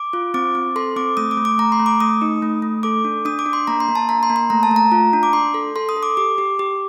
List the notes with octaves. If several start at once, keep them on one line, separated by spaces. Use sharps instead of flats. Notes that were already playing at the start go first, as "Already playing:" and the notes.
Already playing: D6
F4
C4 D6
C4
A4 C6
C4 D6
A3 D#6
D6
A3
D6
A3 A#5
C6
A3
D6
A3 D#6
D#4
A3
A3
A4 D6
D4
D4 D#6
D6
D4
C6
A#3 A#5
C6
A#3
A5
A#3 A#5
C6
A#3
C6
A3 A#5
A5
A3 A#5
F4
D4
D6
D4 C6
A4
A4 C6
D#6
A4
D6
G4 D6
G4
G4